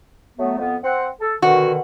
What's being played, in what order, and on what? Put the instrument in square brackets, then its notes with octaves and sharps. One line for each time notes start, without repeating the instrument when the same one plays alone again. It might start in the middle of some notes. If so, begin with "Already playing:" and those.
[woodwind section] F#3 A3 B3
F2 B3
C4 F#5
A4
[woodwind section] B2 D3 D#3 [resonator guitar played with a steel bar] F#4